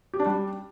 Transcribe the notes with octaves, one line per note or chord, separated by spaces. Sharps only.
G4
D4
G3